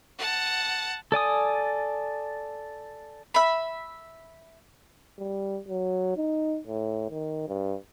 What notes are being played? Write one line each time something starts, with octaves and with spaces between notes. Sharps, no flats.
F#5 A5
A4 D5 G#5 D#6
E5 B5
G3
F#3
D#4
A2
D#3
G2